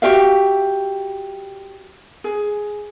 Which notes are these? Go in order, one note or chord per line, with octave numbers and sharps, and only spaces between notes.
F#4 G4 E5 F5
G#4